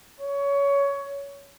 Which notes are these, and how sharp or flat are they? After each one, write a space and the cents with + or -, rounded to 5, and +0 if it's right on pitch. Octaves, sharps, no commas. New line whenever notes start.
C#5 +20